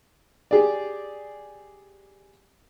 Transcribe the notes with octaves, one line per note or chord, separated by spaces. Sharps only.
G4 G#4 D5